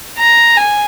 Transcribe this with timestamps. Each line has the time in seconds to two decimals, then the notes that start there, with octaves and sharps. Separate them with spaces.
0.18 A#5
0.57 G#5